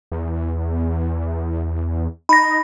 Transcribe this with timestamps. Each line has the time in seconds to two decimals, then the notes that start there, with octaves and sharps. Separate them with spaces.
0.12 E2
2.29 D#4 B5 A#6